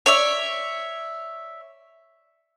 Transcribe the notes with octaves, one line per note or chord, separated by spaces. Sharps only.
C#5 D5 E5